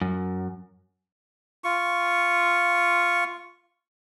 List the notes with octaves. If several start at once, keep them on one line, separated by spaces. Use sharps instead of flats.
F#2
F4 C#6